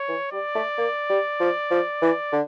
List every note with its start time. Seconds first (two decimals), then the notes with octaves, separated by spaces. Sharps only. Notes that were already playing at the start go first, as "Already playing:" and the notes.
Already playing: C#5
0.08 E3
0.32 G3 D5
0.55 A3
0.78 A#3
1.09 G3
1.40 F3
1.71 F3
2.02 E3
2.32 D3